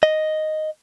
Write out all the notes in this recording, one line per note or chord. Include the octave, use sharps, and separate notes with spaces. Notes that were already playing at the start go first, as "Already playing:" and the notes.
D#5